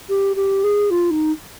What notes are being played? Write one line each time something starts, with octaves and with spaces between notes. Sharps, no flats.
G4
G4
G#4
F4
D#4